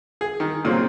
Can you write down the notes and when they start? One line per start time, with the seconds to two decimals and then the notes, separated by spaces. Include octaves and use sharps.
0.21 G#4
0.40 D#3
0.65 A#2 C#3 F#3 C4